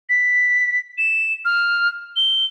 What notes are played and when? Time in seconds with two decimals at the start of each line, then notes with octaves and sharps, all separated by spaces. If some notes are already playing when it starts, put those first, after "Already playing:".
0.09 B6
0.98 E7
1.45 F6
2.16 G7